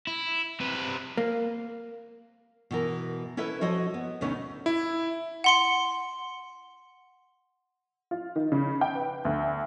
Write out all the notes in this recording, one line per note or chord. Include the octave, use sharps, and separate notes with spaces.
E4
C3 B4
A#3
B2 E3 A#4
C#4 E4 A4 B4 E5
F3 F#4 A4 C#5 D#5
B3
D2 B2 A3 C#4 D#4
E4
F#5 C6 C#7
F4
D#3
C#3
G5
B4
D2